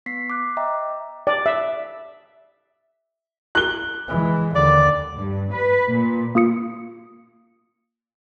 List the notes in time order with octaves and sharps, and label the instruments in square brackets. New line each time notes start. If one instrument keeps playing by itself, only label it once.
[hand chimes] B3 B6 C7
D6 F#6
D#5 E5 G5 A#5 D6
[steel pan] D5
E5
[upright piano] F#6 G7
[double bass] E3 G#3
[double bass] D#2 D3 [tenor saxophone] D5
[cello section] G2
B4
A#2
[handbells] A#3 F4 D#6 C#7